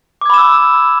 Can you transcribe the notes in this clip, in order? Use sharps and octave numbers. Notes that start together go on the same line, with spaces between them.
B5 D6 E6 G#6 E7